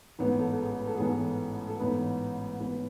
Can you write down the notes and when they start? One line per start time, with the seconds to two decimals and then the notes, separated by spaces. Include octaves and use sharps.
0.19 A1 G#2 E3 B3 B4
0.39 A4
0.52 A4
0.60 G#4
0.79 B4
0.87 A4
0.95 G#4
0.99 A1 G#2 E3 B3 A4
1.68 A4
1.80 A1 G#2 E3 B3 B4
2.59 A1 G#2 E3 B3 B4